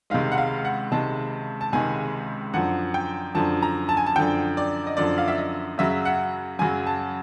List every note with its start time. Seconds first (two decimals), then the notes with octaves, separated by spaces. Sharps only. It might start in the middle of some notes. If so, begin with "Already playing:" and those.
0.10 C#2 C3 D#3 G#3 F5
0.32 F#5
0.38 F5
0.65 F#5
0.91 C#2 C3 D#3 G#3 A5
1.61 A5
1.73 C#2 C3 D#3 G#3 G#5
2.54 F#2 D3 F3 F#5
2.94 G5
3.35 F#2 D3 F3 A5
3.62 A#5
3.89 A5
3.97 G#5
4.06 A5
4.15 F#2 D3 F3 G5
4.57 D5
4.86 D#5
4.97 F#2 D3 F3 D5
5.18 F5
5.28 E5
5.37 D#5
5.78 F#2 C#3 F#3 E5
6.05 F#5
6.59 F#2 C#3 F#3 G#5
6.87 A5